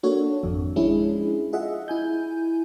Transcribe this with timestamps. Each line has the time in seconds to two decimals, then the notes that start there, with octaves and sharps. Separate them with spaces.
0.03 A#3 D4 F#4 A4 C#5
0.43 G#1 F2
0.76 F3 G#3 C#4 D4 E4 G#4
1.53 F4 G#4 D#5 E5 F#5
1.88 E4 G#5 G6